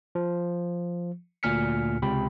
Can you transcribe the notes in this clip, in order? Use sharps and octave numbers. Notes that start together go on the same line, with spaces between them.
F3
D2 A#2 G#5 F6 B6 C#7
C#2 C3 G5 B5